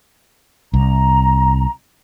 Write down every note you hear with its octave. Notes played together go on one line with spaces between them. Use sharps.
C2 A#5